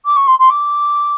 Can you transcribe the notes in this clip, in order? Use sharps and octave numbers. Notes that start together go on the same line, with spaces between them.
D6
C#6
C6
C6
D6